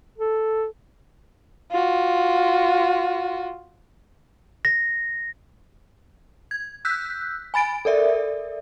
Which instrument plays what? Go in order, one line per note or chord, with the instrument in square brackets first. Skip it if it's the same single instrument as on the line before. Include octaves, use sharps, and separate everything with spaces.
[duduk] A4
[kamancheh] F4 F#4
[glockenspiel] A#6
[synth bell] G#6
E6 F#6 G6 B6
G#5 B5 A6 D7
A4 A#4 D5 E5